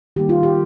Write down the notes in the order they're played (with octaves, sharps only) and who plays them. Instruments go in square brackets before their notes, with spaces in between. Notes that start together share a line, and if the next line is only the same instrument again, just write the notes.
[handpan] D#3 G3 A#3 G4
F4
G4